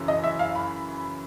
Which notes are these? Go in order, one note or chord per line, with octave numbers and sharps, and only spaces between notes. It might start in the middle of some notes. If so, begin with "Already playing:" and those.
Already playing: F#2 C#3 E3
D#5
E5
F5
B5